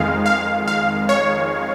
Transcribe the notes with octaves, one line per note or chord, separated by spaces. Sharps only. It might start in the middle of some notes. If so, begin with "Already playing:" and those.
Already playing: F2 D#3 G#3 F5
F5
F5
C#5